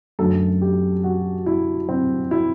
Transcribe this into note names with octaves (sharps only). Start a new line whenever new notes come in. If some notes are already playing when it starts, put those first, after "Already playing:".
F#2 D3 A3 A4
G4
F#4
E4
C4
E4